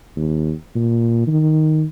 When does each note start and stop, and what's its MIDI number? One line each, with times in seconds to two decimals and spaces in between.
0.16 0.53 39
0.75 1.26 46
1.27 1.85 51